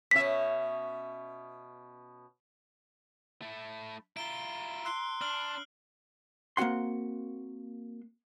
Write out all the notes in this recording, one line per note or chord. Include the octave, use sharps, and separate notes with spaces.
B2 C#4 E5 B6
A3 E4
E4 F4 A#5 D7 G7
C6 E6 F#6 C7
D4 F6 F#7
A#3 C4 F#4 F#5 C6